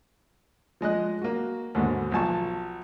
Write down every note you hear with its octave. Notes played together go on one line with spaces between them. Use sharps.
F3 G#3 D#5 F#6
A#3 F#4
D#2 G#2 B2 D3
B1 F3 G#5 A5 C#6